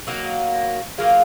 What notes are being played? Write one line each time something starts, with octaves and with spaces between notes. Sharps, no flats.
F#3 A#3 D#4 F#4
F#3 A#3 F4 G#4